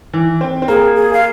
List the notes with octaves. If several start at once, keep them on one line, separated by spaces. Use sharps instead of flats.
E3
C4
C4
A#3 G#4
G#4
F5